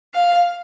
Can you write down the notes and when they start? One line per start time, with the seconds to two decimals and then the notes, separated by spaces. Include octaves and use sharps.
0.14 F5